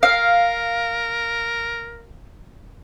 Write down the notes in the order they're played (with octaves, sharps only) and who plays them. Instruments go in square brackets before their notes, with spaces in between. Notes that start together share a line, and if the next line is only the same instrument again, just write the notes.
[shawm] A#4 [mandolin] F5